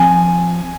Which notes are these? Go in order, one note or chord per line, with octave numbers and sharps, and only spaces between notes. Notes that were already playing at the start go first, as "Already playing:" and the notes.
Already playing: F3 C4 G#5